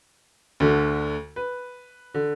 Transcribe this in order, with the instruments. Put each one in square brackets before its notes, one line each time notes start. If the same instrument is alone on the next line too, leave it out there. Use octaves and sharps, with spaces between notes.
[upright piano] D2 D3
B4
D3